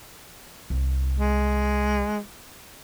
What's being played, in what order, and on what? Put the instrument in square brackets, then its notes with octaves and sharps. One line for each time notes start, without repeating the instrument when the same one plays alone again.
[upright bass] C2
[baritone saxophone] G#3